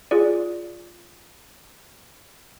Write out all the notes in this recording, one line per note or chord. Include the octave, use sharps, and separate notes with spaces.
F4 G#4 D5